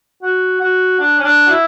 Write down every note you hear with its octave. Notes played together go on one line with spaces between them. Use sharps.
F#4
F#4
D4
C#4
D4
F#4
E4